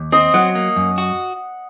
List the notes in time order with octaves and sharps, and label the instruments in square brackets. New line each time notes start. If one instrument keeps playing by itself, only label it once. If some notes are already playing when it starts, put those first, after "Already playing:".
Already playing: [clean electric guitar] D#2
[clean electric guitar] C4 [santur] D#5
[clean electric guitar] F#3 [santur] F#5
[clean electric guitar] A#3
F#2
F#4